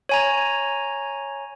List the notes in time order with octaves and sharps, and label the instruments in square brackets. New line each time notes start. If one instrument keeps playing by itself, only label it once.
[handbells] C#5 G#5 A#5